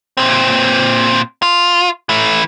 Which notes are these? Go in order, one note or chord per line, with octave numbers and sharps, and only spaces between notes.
A#2 C4
F4
E3 A3